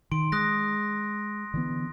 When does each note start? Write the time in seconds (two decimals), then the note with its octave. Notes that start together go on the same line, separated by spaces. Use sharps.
0.11 D#3 C6 D7
0.32 G#3 D#6 F#6 A#6
1.54 D3 E3 B3